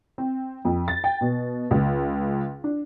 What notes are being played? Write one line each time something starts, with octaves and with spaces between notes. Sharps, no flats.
C4
F2
A6
G5
B2
C#2
D4